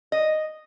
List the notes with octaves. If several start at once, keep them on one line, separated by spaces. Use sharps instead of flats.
D#5